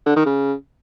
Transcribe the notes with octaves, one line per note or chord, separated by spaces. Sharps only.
D3
D#3
C#3